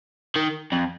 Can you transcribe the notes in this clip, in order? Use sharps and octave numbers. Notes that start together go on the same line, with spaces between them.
D#3
F2